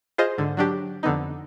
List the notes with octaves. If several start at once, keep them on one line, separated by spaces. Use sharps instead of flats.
F4 G#4 C5 D#5
G#2 D3
F#3 D4 G4
F2 D3 B3 D#4